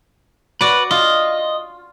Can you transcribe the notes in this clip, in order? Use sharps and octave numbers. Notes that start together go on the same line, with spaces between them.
F#4 B4 D5
F4 D#5